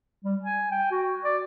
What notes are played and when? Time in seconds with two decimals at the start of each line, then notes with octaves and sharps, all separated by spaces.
0.24 G3
0.42 G#5
0.71 G5
0.91 F#4
1.24 D5